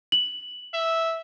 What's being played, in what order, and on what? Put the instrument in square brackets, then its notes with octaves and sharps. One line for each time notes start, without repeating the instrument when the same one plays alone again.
[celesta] F#7
[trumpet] E5